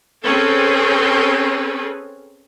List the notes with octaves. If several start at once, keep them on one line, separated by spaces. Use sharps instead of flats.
C4 C#4 G#4 A4 B4